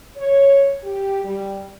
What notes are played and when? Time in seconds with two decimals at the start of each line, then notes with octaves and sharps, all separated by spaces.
0.16 C#5
0.83 G4
1.24 G3